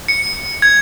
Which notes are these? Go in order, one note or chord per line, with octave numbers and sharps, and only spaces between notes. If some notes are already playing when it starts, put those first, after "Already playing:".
C#7
G#6